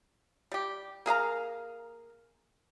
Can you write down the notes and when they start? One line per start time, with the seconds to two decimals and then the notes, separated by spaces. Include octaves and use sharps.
0.52 G3 G4
1.06 A#3 G#4 F5 A#5